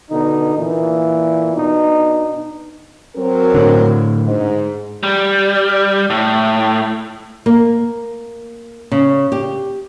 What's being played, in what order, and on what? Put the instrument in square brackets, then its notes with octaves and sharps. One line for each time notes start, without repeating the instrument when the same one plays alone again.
[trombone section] B2 D3 D#4
A#2 E3
B2 D4 D#4
[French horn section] F#3 C4 A#4
[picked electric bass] A2 D3
[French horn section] G#2
[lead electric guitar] G3
A2
[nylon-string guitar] A#3
C#3
G4